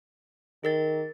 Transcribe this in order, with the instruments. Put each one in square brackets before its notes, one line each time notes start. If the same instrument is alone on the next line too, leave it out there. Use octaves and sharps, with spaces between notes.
[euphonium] D#3 [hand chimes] G#4 A#4 A6